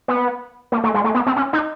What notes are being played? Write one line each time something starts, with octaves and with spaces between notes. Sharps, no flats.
B3
A#3
A3
G#3
A3
B3
C4
C#4
D#4